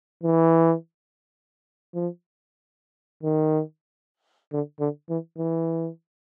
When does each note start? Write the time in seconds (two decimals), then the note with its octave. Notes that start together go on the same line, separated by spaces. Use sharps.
0.23 E3
1.94 F3
3.23 D#3
4.52 D3
4.80 D3
5.09 E3
5.38 E3